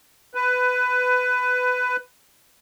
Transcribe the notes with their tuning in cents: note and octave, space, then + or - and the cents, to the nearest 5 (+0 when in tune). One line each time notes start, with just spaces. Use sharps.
B4 +15